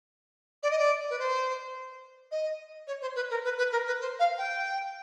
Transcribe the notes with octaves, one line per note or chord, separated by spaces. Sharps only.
D5
D#5
D5
B4
C5
D#5
C#5
C5
B4
A#4
B4
B4
A#4
B4
C5
F5
G5